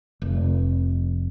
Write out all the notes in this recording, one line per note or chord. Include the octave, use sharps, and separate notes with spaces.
F1